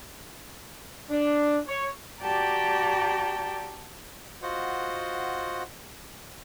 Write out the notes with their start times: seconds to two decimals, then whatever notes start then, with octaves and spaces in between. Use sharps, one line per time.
1.10 D4
1.68 C#5
2.21 F#4 G4 D5 G5 A5 A#5
4.42 F4 F#4 C5 D#5 F#5